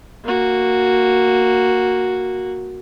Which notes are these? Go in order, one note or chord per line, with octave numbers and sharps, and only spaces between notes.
A#3 F#4